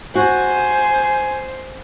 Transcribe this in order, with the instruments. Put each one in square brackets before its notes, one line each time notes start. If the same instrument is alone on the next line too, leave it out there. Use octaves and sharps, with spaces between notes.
[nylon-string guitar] F#4 [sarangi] C5 [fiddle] G#5